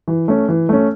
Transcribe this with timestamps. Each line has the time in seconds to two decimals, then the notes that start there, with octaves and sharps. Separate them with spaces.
0.08 E3
0.28 A3 C#4
0.49 E3
0.69 A3 C#4